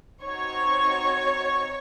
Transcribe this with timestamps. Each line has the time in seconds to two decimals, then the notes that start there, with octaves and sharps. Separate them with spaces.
0.22 C4 D#4 F#4 C#5 C#6